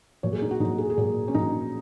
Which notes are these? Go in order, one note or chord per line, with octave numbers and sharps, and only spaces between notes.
A#2 F#3 C#5
G#4
D#4
F#4
A#2 F#3 D#4
G#4
G#4
A#2 F#3 F#4
C#4
A#2 F#3 D#4